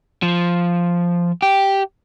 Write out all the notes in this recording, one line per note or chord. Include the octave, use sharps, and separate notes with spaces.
F3
G4